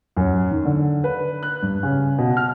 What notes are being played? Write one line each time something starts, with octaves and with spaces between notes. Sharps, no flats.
F#2
D#3
D3
B4
F#6
G2
C#3
B2
F6